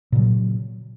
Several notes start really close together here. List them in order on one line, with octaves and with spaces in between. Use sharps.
A#2 C#3 F#3